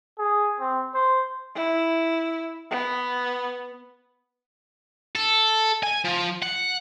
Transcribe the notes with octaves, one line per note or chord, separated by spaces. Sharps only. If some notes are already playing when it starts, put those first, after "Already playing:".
G#4
C4
C5
E4
B3
A4
G#5
F3
F#5